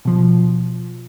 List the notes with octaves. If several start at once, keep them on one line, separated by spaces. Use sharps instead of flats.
B2 F3